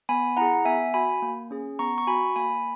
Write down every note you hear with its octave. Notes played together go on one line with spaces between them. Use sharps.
B3 G#5 B5
E4 G#4 F#5 A#5
B3 E5 G#5
F#4 G#5 B5
A#3
C#4 G#4
B3 A#5 C#6
C#6
F#4 G#5 B5
A#3 G#5 B5